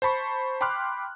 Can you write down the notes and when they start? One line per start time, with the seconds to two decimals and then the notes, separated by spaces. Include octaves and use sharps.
0.02 C5 A5 B5 C#6
0.61 G5 B5 C6 D6 F6 F#6